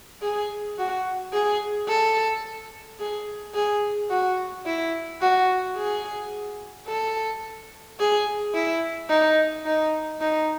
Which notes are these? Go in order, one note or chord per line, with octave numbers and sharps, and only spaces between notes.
G#4
F#4
G#4
A4
G#4
G#4
F#4
E4
F#4
G#4
A4
G#4
E4
D#4
D#4
D#4